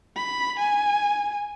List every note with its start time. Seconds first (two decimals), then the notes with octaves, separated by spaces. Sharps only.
0.17 B5
0.59 G#5